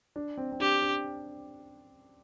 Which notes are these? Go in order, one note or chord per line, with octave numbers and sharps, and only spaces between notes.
D4
C4
C4
D4 G4
D4